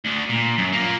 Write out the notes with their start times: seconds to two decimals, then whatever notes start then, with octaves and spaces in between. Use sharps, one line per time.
0.05 D2 D3
0.29 A#2
0.58 F#2
0.72 A#2 A#3